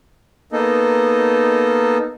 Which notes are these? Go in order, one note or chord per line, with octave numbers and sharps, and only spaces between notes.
A#3 B3 D#4 A4 D#5